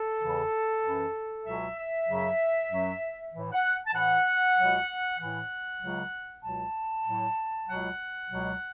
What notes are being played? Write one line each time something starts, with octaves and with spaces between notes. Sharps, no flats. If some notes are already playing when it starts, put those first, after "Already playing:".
Already playing: A4
E2 C#3 E3
F#2 E3
C#2 B2 F#3 E5
E5
F#2 C#3 F#3
F#2 F#3
A2 E3
F#5
A5
A2 E3 F#5
C#2 B2 F#3
A2 E3 F#5
C#2 C#3 F#3
C#2 B2 F#3 A5
A2 F#3
C#2 B2 F#3 F#5
C#2 B2 F#3